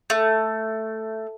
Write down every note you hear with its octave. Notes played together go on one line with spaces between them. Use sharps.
A3